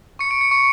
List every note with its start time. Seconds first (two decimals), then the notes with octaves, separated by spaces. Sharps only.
0.19 C#6 C#7
0.31 D7
0.41 C#7
0.51 C#6 C#7